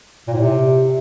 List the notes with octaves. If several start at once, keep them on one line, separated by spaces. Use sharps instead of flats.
A#2
A2
C3